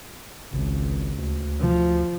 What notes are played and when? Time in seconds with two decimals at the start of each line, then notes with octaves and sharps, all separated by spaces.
0.52 G#1 C#2
1.18 D2
1.60 F3